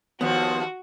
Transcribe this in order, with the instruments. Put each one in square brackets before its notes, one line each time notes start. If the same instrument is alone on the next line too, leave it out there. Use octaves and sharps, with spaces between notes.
[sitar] D#2 F3 [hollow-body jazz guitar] B3 [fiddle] F#4